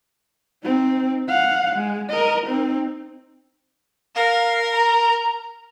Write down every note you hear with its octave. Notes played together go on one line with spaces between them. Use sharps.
C4 D#4
F5 F#5
G#3
A#4 D#5
C4 D#4
A#4 F5
A#5